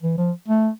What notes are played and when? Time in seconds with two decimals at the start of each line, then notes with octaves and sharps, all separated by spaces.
0.02 E3
0.18 F3
0.48 A3